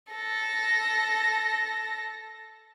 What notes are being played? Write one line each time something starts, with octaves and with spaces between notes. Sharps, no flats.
A4 A#6